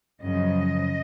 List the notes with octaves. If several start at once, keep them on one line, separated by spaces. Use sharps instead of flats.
F#2 C#3 F3 D#5